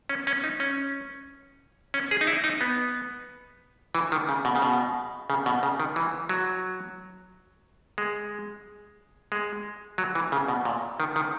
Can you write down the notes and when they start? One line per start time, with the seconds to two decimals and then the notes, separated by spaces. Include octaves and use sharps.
0.09 C#4
0.27 C#4
0.44 D#4
0.60 C#4
1.94 C#4
2.11 G#4
2.21 D#4
2.27 E4
2.44 D#4
2.61 B3
3.95 E3
4.12 D#3
4.29 C#3
4.45 B2
4.55 C#3
4.62 B2
5.30 C#3
5.46 B2
5.63 C#3
5.80 D#3
5.96 E3
6.29 F#3
7.98 G#3
9.32 G#3
9.98 F#3
10.15 E3
10.32 C#3
10.48 B2
10.65 A#2
11.00 D#3
11.16 D#3